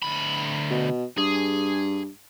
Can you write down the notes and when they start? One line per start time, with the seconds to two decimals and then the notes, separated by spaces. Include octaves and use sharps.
0.03 D2 B5
0.70 B2
1.18 G2 G#4